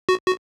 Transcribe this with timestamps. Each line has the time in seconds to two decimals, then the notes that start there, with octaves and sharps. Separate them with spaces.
0.09 F#4
0.27 F#4